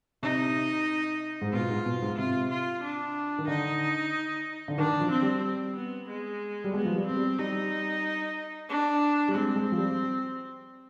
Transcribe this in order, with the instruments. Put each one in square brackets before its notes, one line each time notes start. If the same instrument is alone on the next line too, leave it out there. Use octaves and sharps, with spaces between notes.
[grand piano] C3 [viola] D#4
[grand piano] G#2
[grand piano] B2 [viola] F4
[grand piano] G#2
B2
G#2
[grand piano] C3 [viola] F4
[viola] F4
D4
[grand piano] D#3
[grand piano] D3 [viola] D#4
[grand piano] D3
[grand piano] D#3 [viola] D4
[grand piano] F3
[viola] C4
[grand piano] G3
[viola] C4
B3
G#3
[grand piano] G3
[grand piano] G#3 [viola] B3
[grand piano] F3
G3
[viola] C4
[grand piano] G3
[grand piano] G3 [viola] D#4
[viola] D4
[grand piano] G3
[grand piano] G#3 [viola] C4
[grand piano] G#3
F3
G3